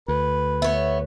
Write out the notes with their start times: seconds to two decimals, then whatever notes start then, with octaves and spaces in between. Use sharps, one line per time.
0.08 D2 B4
0.62 B3 C#5 E5